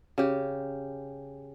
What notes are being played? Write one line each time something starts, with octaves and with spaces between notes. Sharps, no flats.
C#3 G4